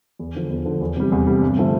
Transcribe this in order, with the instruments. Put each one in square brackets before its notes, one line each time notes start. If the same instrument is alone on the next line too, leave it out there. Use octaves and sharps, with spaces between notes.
[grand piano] E2
D3 F3
E2
D3 F3
E2
C3 G3
E2
C3 G3
G2
D3 F3 A3